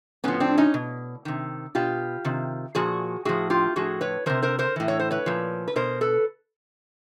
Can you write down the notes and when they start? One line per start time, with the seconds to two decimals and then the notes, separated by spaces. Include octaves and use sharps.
0.24 A2 F3 B3 C#4
0.40 C4 D4
0.58 C#4 D#4
0.74 B2
1.25 C3 D#3
1.75 B2 F4 G4
2.25 C3 D#3
2.75 A#2 F3 F#4 G#4
3.25 A2 F3 F#4 G#4
3.50 F4 G4
3.76 A2 F3 F#4 G#4
4.01 B4 C#5
4.26 C3 F3 A#4 C5
4.42 A#4 C5
4.59 A#4 C5
4.76 A2 E3
4.88 C#5
5.00 C5
5.11 B4 C#5
5.26 A#2 F3
5.68 B4
5.76 B2 A#4 C5
6.01 A4 B4